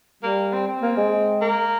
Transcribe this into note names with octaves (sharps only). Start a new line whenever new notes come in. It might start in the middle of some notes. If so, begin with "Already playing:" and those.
G3 A#3
C4
C4
A#3
G#3
A#3